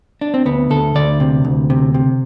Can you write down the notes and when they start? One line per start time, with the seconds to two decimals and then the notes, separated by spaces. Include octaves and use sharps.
0.21 D4
0.34 C4
0.45 D2 B3
0.70 D2 A4
0.95 D2 D5
1.20 C3
1.45 D2
1.70 C3
1.94 C3